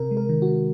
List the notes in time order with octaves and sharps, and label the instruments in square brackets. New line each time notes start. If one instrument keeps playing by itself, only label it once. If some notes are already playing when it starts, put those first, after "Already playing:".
Already playing: [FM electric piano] C3 A#4
G#3
A#4
D#3
F#4